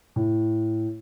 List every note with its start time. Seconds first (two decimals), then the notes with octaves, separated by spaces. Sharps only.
0.16 A2